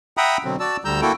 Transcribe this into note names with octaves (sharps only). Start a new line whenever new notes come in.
E5 F#5 G5 A#5 B5 D#6
B2 D3 F#3 C4
F#4 D5 A5 E6
D2 D3 G3 A#5 E6 G6
A#3 E4 F#4 A4 G5